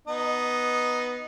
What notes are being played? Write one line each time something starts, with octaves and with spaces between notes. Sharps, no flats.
B3 D#4